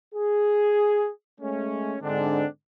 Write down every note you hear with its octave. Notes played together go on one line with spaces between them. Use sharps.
G#4
G#3 A3 C#4
G#2 D3 C4 D4